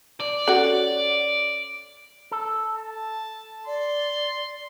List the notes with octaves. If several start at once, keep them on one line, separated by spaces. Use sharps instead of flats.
D5
C#4 F#4 A4
A4
A5
D5 C6